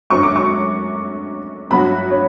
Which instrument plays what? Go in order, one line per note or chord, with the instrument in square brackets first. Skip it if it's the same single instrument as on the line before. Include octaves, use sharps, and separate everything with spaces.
[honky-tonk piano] F#2 D3 F#3 C#4 [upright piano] C#6
[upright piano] D6
C#6
[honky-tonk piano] G1 G2 F#3 B3 F#4 [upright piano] B5
[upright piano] C#5